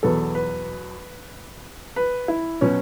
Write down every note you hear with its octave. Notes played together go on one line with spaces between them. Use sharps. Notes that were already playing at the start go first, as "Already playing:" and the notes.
E2 B2 F#3 B3 A4
B4
B4
E4
B2 F#3 C#4